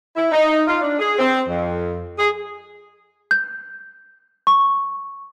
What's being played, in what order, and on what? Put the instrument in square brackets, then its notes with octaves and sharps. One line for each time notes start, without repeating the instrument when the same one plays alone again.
[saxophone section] E4
D#4
F4
D4
G#4
C4
F2
G#4
[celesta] G6
C#6